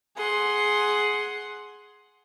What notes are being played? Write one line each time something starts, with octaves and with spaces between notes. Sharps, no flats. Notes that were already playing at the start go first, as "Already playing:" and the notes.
G#4 F#5 C6